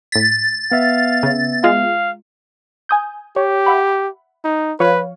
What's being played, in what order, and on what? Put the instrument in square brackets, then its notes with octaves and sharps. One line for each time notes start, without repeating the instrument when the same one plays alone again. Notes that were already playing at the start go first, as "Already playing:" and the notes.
[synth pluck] A2 B6 [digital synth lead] A6
[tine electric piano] B3 E5 [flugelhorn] F5
[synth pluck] C#3
[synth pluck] G#3 F4 [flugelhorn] F5
[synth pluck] G#5 D#6 G6
[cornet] G4 [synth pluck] C#5
[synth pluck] E5 F#5 B5
[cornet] D#4
[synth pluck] F3 C#5 F5 [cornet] B4